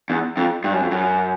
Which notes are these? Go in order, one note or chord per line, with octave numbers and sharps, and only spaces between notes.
E2
F2
G2
F#2
F2
F#2